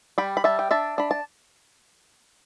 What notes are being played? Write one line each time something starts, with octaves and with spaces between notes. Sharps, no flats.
G3 G5 B5
B5
G3 E5 A5
G5
D4 E5 A5
D4 B5
A5